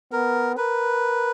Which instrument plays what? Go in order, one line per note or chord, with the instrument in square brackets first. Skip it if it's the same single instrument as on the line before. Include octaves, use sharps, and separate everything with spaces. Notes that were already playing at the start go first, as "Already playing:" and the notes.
[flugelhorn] B3 [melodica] A#4
[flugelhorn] A#4 [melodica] B4